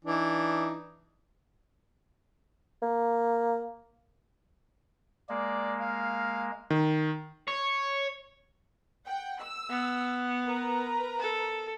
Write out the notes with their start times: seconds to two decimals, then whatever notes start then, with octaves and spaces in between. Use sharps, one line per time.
0.05 E3 D4 D#4
2.82 A#3
5.29 G#3 A#3 D5
5.80 F5
6.70 D#3
7.48 C#5
9.05 F#5 G5
9.40 E6
9.70 B3
10.48 A#4 B4 A#5
11.20 A4